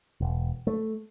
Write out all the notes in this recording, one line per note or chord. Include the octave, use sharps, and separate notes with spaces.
E1
A3